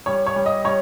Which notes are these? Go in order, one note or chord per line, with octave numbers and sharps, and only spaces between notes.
G3 C#5
C#5
G3
D#5
G3 C#5